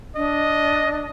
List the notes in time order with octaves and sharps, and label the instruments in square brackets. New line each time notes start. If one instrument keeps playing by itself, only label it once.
[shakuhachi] D4 [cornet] D#5